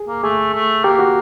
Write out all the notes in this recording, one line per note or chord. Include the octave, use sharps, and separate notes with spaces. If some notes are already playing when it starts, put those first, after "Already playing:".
Already playing: G#4
A#3
A3 G#4
A3
A#3 G4
F#4